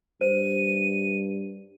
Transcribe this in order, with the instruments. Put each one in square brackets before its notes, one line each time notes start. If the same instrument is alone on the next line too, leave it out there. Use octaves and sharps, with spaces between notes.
[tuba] G2 [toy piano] C5 [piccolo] D#7